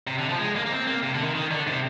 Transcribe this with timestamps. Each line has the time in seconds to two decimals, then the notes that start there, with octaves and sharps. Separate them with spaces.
0.07 C3
0.19 D3
0.29 F3
0.39 G#3
0.56 A#3
0.66 A#3
0.72 C4
0.87 A#3
1.03 C3
1.14 D3
1.24 D#3
1.35 D#3
1.51 D3
1.67 C3